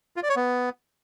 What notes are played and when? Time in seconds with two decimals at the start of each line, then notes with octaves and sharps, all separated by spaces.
0.16 F4
0.23 D5
0.29 C#5
0.36 B3